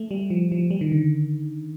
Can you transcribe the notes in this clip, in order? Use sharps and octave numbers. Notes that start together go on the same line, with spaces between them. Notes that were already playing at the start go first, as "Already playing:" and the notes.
Already playing: A3
G3
F3
F3
G3
D#3
D3